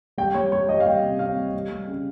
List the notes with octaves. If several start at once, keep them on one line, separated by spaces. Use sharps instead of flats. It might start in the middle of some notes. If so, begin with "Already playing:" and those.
G3 G5
G3 C#5
G3 C#5
G3 D#5
F5
G3 G5
C3
C3 F5
G3
G3
G3
C#3